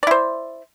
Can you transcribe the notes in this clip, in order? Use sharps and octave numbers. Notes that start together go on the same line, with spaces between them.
E4 C5 D5